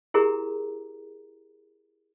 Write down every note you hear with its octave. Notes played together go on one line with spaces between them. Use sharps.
E4 G4 G#4 A#4 A#5